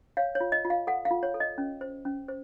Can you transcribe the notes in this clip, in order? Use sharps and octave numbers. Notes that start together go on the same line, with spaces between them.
C#5 F5
C#5
F4
D#5
F4
F5
A4 F#5
F5
F4
C#5
A4
D#5
C#4
C5
C#4
C5